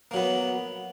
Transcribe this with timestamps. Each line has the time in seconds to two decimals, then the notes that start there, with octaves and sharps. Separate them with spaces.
0.11 A#3
0.14 F#3
0.16 B3